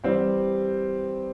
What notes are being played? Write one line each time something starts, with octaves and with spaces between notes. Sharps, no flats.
E3 G3 C4 G4